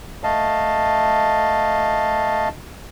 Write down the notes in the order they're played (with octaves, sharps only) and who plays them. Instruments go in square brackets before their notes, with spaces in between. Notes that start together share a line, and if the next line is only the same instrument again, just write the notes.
[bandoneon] A3 D#5 F5 A5